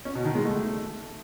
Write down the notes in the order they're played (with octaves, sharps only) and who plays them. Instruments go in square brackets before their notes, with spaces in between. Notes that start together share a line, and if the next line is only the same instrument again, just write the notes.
[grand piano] C#4
B2
D#3
G#3
A3